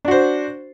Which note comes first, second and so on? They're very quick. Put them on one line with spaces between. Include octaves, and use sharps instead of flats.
D4 F#4 C5